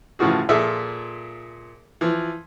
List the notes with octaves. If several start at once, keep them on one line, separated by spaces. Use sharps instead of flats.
A2 C#3 E3 F3 F#4 G#4
A#2 F3 G#4 A4 E5
E3 F3